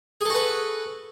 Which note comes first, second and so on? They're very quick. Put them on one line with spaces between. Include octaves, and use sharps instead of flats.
G#4 A4 F#4 B4